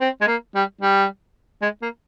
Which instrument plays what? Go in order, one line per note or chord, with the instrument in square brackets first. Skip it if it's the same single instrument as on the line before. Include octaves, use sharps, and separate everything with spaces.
[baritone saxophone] C4
G#3
A#3
G3
G3
G#3
A#3